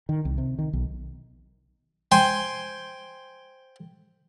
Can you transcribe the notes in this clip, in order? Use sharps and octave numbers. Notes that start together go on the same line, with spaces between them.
D#3
C2
C3
D#3
B1
C5 G5 G#5